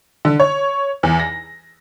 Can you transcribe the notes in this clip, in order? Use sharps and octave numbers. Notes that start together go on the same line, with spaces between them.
D3
C#5
E2
A#6